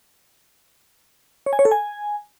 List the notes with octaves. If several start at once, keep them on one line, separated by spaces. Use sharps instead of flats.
C#5
G#5
C#5
A4
G#5